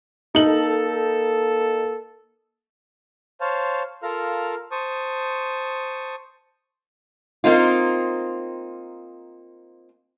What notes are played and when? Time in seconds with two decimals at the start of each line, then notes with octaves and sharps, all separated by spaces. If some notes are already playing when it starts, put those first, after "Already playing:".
0.35 A#3 D#4 A4 F#7
3.41 C5 C#5 F5 A5
4.03 F4 A4 A#4 F5 A#5 F6
4.71 C5 A5 C#6 D#6
7.44 A#3 C4 D#4 F4